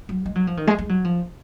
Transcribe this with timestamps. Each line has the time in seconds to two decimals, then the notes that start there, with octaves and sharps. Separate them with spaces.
0.09 F#3
0.26 G#3
0.35 F#3
0.47 F3
0.57 D#3
0.67 G#3
0.78 G#3
0.89 F#3
1.04 F3